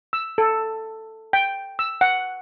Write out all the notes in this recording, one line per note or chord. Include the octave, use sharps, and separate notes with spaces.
E6
A4
G5
E6
F#5